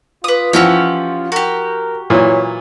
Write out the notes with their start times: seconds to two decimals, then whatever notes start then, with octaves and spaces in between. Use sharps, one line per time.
0.24 F4 B4 D#6
0.53 E3 F3 C#4 F#4 G4 E6
1.32 F#4 G4 A#4
2.10 A#2 E3 F#3 C#5